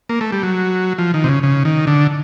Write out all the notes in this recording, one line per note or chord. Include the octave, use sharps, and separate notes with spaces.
A#3
A3
G3
F#3
F3
D#3
C3
C#3
C#3
D#3
D3